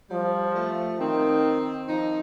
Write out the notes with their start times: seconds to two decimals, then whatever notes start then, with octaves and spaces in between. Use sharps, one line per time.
0.10 F3 G3
0.56 A3
0.99 D#3 C4
1.88 F3 D#4